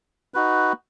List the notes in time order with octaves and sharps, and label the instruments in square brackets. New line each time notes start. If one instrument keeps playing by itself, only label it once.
[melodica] D#4 F#4 B4